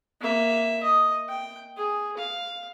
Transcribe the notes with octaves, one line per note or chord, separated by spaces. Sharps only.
A#3 E5
D#5
G5
G#4
F5